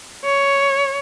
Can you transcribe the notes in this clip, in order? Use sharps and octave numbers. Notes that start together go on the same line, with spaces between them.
C#5